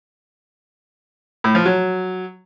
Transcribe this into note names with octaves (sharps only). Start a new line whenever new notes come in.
A2
F3
F#3